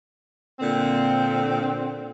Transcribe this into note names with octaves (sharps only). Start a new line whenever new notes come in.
A#2 D3 C4